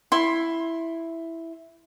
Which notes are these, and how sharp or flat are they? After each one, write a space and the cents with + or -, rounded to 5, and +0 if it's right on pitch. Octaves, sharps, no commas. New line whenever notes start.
E4 +0 C6 +20